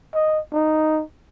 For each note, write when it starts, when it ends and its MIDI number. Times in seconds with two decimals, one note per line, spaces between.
0.14 0.39 75
0.53 1.02 63